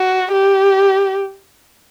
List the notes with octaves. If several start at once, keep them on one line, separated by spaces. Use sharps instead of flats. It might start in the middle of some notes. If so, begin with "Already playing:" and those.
Already playing: F#4
G4